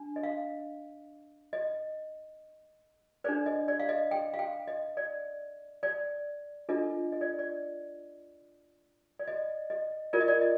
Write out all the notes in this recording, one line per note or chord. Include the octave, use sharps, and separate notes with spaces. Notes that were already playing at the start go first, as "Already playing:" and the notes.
Already playing: D4
D#5
F5
D#5
D4 A4 C5 D5
D#5
D5
F5
D#5
G5
F5
G5
D#5
D5
D5
D4 F4 A4 D#5
D#5
D5
D5
D5
D#5
D#5
F4 A#4 D5
D#5
D5
D#5